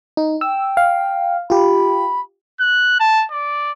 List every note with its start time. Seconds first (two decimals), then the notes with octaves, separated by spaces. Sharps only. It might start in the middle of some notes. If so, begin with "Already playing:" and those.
0.17 D#4
0.41 G5 E6
0.77 F5
1.50 F4 G4 B5
2.60 F#6
3.00 A5
3.32 D5